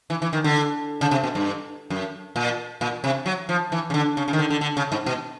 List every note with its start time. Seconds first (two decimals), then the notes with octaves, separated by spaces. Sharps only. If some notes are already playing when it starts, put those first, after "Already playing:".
0.10 E3
0.22 E3
0.33 D#3
0.44 D3
1.01 C#3
1.11 C3
1.23 B2
1.35 G2
1.90 F#2
2.36 A#2
2.81 A#2
3.04 C3
3.26 F#3
3.49 F3
3.72 E3
3.90 C#3
3.94 D3
4.17 C#3
4.28 C#3
4.33 D#3
4.39 D3
4.50 D3
4.61 D3
4.77 C#3
4.92 G#2
5.06 B2